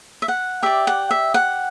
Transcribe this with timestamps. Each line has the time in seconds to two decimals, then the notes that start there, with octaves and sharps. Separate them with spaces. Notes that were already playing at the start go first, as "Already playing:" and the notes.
0.22 E5
0.28 F#5
0.62 G4 D5 E5
0.87 F#5
1.11 E5
1.34 F#5